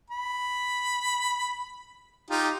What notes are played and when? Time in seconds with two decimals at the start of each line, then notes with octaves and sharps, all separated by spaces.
0.10 B5
2.31 D#4 F4 G4